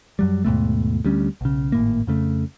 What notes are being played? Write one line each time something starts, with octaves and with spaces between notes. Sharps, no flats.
F#2 F#3 G3
D#2 G#2 B2 A3
D2 G3 C#4
B1 C#3
G#1 A2 A#3
F2 C#3 A3